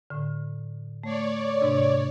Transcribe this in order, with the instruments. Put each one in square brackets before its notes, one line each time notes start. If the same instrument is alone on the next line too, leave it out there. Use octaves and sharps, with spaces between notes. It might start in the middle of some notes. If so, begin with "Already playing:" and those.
[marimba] A2 D3
[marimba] A3 [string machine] C#5 D5
[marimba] G#2 C3 D4